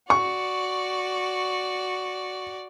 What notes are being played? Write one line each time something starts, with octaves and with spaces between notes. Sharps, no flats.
F#4 D5 C#6